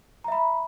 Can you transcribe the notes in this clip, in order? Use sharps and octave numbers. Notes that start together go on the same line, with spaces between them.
E5 A#5 B5